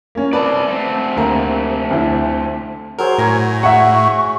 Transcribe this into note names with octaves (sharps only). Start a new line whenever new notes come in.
A#3 C#4
C4 B4 D5 A5 B5
A3 C4
D2 A#3 A#5
D2 E4
F#3 G#4 A#4 C5
A2 C#5 G#5 A#5
E5 F#5 C#6